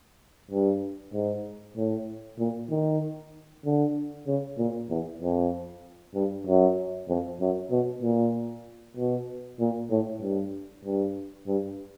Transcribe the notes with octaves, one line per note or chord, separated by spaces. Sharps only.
G2
G#2
A2
A#2
D#3
D3
C#3
A#2
E2
F2
G2
F#2
F2
F#2
B2
A#2
B2
A#2
A2
G2
G2
G2